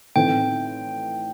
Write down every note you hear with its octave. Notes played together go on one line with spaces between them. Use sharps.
A2 E3 A3 C4 D#4 G5